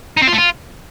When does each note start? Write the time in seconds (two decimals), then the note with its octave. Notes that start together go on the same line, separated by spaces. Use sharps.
0.17 D#4
0.22 C4
0.27 F4
0.33 A3
0.38 F4